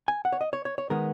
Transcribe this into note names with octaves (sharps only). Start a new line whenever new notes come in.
G#5
F#5
C#5
D#5
C#5
C#5
C#5
D#3 G#3 B3 A#4